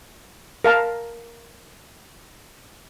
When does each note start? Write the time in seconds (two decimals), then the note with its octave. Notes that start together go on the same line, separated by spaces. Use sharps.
0.64 A#4 F5 A5